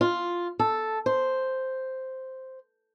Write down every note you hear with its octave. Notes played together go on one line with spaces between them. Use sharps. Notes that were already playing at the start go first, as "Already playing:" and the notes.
F4
A4
C5